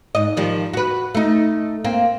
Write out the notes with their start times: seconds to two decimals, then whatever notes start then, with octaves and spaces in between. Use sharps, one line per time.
0.15 G#2 D#5
0.37 D#3 F3 G3
0.73 F#4 B4
1.15 A3 D#4
1.84 A#3 C4